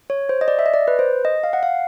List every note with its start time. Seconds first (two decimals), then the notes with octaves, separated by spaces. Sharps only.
0.10 C#5
0.29 C5
0.41 D#5
0.48 D5
0.59 E5
0.66 D#5
0.74 D5
0.88 B4
0.99 C5
1.25 D#5
1.44 F5
1.53 F#5
1.63 F5